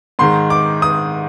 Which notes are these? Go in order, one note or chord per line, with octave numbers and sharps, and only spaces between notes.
G#2 D#3 G#3 C6
D6
D#6